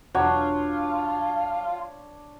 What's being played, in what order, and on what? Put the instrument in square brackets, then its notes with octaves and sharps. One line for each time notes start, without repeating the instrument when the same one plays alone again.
[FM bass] E1 [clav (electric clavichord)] F#3 [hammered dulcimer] D4 C#5 [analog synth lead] F4